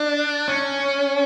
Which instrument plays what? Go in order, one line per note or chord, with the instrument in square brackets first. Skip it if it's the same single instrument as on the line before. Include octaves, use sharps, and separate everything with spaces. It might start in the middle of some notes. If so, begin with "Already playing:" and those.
Already playing: [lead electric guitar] D4
C#4